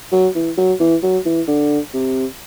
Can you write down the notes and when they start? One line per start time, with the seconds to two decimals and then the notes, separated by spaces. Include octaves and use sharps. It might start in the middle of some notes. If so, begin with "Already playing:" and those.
0.12 F#3
0.35 E3
0.57 F#3
0.80 E3
1.03 F#3
1.26 E3
1.48 D3
1.94 C3